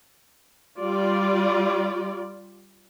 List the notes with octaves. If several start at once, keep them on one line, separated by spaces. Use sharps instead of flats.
G3 F4 D5